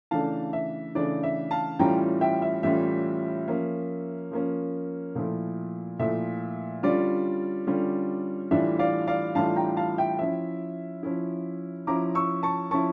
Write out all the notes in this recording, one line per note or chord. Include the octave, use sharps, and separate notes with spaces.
C#3 E3 A3 D4 F5 A5
E5
C#3 E3 A3 D4 D5
E5
F5 A5
A2 E3 G3 C#4 F4 G5 A#5
E5 G5
E5
A2 E3 G3 C#4 F4 E5
F3 A#3 C#4
F3 A#3 C#4
A#2 F3 A3 E4
A#2 F3 A3 E4 E5
D3 G3 C#4 F4 D5
D3 G3 C#4 F4
A2 E3 G3 D4 F4 E5
D5 F5
D5 F5
A2 E3 G3 D4 F4 F5 A5
G5 A#5
F5 A5
E5 G5
F3 C#4 E4 E5
F3 C#4 E4
F3 C#4 E4 A#5 D6
C#6 E6
A5 C#6
F3 C#4 E4 A5 C#6